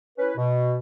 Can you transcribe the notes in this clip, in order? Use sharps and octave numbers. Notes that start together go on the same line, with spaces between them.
C#4 E4 B4
B2